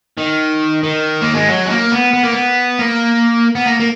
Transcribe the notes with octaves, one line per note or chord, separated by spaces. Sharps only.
D#3
D#3
A#3
G#3
F#3
G#3
A#3
B3
B3
A#3
B3
A#3
B3
A#3
A#3